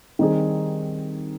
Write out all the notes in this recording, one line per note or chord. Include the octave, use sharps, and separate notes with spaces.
D#3 G3 C4 D#4 G#4